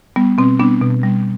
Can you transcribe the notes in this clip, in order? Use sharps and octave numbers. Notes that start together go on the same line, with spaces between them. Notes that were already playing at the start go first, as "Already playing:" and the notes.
G3 B3
B2 C4
G3 B3 D4
B2
G3